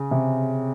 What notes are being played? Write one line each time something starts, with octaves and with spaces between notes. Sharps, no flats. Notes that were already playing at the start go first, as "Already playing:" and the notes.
Already playing: C#3
C3